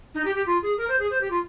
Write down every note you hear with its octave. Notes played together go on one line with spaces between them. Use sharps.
D#4
G4
G4
F4
G#4
A#4
C5
G#4
C5
G4
F4